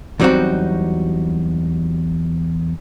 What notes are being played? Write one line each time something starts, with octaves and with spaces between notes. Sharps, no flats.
E2 F#3 G3 C4 D#4 F#4